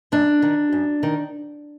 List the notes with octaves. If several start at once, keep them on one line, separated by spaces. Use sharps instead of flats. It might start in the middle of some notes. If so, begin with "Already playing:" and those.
F#2 D4
D#3
F#2
D#3